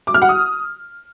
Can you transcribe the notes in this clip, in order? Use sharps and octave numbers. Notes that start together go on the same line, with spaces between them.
D6
F6
F#5
D#6